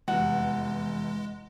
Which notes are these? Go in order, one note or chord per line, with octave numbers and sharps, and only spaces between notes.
F1 E2 G#3 F#4